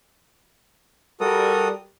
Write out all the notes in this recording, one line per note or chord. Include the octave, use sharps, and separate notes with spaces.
G3 F#4 A4 A#4 D#6